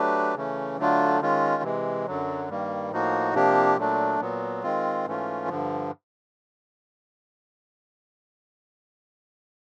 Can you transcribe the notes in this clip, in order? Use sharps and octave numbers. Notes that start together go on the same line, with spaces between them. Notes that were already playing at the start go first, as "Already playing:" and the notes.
Already playing: F#3 A3 D4 G4 B4
C#3 E3 A3 C#4
D3 F#3 A3 D4 F4
D#3 G#3 C#4 F4
C3 E3 G#3
F#2 D3 F#3
G2 D#3 G3 A#3
A2 F3 A#3 D#4 F#4
C3 F3 A#3 D4 G4
A#2 F#3 A3 D4
A#2 F#3 B3
D#3 G#3 C4 F4
G#2 E3 A3 C#4 F4
G2 D3 F3